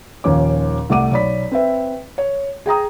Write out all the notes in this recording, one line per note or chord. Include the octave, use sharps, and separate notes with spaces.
D#1 D#2 F3 C#4 D6
C2 A3 F#5 D6 D#7
B1 C#5 D5 B5 B6
C4 B4 E5
C#5
G#4 G5 A#5 D#6